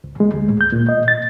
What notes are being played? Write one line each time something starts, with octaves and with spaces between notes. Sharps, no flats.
C#2
G#3
D2
A2
G6
A#2
D#5
A6